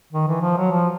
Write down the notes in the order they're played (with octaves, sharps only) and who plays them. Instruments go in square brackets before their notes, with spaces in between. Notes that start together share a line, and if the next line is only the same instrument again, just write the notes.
[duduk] D#3
E3
F3
F#3
F3